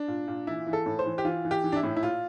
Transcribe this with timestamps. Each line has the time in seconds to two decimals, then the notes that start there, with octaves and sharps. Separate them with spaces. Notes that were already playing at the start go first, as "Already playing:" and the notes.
Already playing: D4
0.08 A#2
0.28 A#2
0.47 E3 E4
0.67 E3
0.73 A4
0.86 A2
0.99 C5
1.06 E3
1.18 G4
1.25 E3 F4
1.45 E3
1.51 G4
1.64 E3
1.72 D4
1.76 E4
1.83 A2
1.96 E4
2.03 A#2 F4